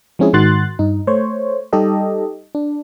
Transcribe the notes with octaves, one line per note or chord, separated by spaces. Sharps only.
F3 G#3 C4 C#4 E4 G#4
G#2 D#3 F#4 C6 F#6 A6
G2 D#4
A3 C5 C#5
G3 D#4 G4 A4 D#5
D4